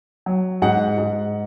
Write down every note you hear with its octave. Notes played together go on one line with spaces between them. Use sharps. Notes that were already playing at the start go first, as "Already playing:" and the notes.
F#3
G#2 F#5
G#2